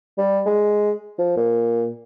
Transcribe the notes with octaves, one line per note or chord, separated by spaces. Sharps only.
G3
G#3
F3
A#2